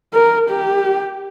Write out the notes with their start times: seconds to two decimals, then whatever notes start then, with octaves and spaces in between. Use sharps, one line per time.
0.13 A#4
0.50 G4